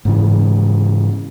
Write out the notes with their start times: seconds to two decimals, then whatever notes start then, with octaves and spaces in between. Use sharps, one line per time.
0.05 G#2 C#3 E3